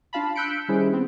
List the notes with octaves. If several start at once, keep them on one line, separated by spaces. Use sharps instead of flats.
D4 F4 F5 A5 B5
E6 F#6 G6 B6 C#7 D7
D#3 G3 C#4 E4 G#4 C5
B3 C4